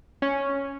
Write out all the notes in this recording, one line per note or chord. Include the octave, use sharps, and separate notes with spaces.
C#4